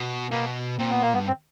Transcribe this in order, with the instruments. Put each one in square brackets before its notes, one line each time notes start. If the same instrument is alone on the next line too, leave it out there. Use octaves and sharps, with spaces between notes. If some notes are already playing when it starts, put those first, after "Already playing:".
Already playing: [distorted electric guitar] B2
[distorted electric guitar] B2 [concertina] A#3
[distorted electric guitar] A#2 [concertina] C4
[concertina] B3
A#3
[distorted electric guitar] G2 [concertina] B3
[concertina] C4